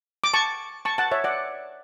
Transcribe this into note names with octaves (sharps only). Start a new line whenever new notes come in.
D6
A5 C#6
A5 C#6
F#5 A5
C#5 E5
D5 F#5